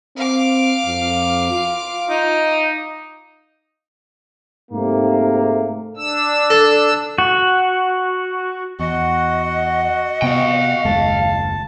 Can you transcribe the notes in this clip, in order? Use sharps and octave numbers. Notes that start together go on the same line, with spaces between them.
C4 F5 D6
F2
F4
D#4
G#2 C3 A3 A#3
D4 E6
A4
F#4
E2 F#4 D#5 F#5
C3 B3 F5 G5
F#1 D#2 G#3 A5